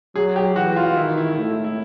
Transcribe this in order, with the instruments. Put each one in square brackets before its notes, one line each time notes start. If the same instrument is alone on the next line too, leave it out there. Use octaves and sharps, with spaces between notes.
[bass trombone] F#3 [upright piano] G#4
[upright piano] G4
[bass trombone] E3 [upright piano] F#4
[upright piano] F4
[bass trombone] D#3 [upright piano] E4
[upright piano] E4
[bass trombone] A2 [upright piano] E4
[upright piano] E4